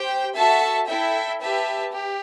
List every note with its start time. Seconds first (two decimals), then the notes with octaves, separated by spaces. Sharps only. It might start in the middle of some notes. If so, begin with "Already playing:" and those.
Already playing: G4 C5 G5
0.35 F#4 A4 E5 A5
0.88 E4 A4 E5 G5
1.41 G4 B4 E5 A5
1.92 G4